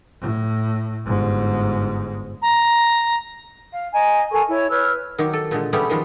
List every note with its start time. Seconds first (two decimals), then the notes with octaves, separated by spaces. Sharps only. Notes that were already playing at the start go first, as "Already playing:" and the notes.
0.21 A2
1.06 G1 G#2
2.42 A#5
3.72 F5
3.93 D#5 G#5 A#5
4.31 A4 A#4 G#5 C#6
4.48 E4 C#5
4.69 B4 C#5 E6 F6
5.18 D#3 F#3 G4
5.33 A4
5.51 A#2 D3 G#3
5.73 G3 A3 B3 C#4 G4 G#4
5.90 D#3 F3 G3 G#3